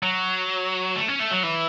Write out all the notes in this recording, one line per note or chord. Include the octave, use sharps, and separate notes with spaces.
F#3
A3
C#4
A3
F#3
E3